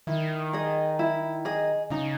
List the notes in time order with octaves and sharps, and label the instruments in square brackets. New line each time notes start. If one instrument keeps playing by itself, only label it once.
[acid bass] D#3 [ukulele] E4
[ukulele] G#4 D#5
E4
G#4 D#5
[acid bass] C#3 [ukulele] D#4